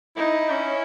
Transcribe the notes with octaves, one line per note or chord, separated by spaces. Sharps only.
D#4 E4
C#4